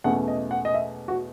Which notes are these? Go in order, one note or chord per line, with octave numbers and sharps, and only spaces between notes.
E2 B2 A3 C#4 F#5
D#5
F#5
D#5
E5
F#4